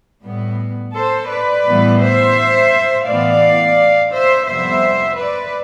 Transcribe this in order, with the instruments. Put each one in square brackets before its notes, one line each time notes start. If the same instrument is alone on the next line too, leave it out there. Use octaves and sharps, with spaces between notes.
[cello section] A2 G3 B3
A4 C5
B4 D5
A2 E3 G3 B3
C5 E5
A2 E3 B3 D5 F5
C5 E5
F2 C3 G3 B3 C5 E5
B4 D5